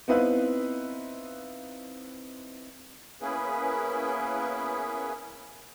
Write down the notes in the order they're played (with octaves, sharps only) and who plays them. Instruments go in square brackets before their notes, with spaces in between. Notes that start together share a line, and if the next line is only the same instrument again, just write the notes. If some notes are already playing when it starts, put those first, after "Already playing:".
[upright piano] B3 C4 D#4 E4 B4 F5
[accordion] A#3 B3 C#4 E4 G#4 B4